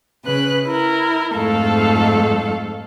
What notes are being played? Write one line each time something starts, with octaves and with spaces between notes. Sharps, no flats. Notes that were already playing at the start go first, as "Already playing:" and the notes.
C#3 B4 F#6
E4 A#4
F2 G#2 A3 A4 F5